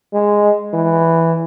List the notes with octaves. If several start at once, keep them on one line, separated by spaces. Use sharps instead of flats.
G#3
E3